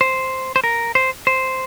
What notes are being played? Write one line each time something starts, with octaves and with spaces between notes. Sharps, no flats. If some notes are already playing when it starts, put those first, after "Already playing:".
C5
C5
A#4
C5
C5